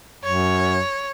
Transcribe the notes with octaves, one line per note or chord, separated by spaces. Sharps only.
F#2 C#5